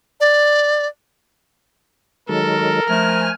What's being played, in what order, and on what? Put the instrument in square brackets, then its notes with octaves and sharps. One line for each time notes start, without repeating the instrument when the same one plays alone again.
[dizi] D5
[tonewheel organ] D#3 F#3 G#3 [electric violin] A4 [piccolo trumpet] A#4
[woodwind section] F3 A3 [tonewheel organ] G#5 [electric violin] F6